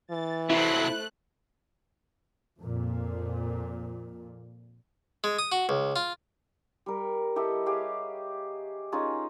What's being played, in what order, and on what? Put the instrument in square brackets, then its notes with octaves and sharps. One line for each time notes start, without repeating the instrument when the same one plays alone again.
[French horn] E3 [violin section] A6
[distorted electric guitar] C3 F#3 [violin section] A3 C5 F#6 [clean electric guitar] E4
[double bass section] F2 A#2
[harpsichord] G#3
D#6
F#4
C#2
F4
[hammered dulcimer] G3 A#4
E4 G4 A4 D#5
G4 G#4 C#5 F5
C#4 D#4 F4 G#4